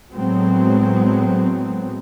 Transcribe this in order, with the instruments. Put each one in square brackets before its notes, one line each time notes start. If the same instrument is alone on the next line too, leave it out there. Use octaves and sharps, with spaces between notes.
[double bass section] A2 F#3 G#3 B3 C4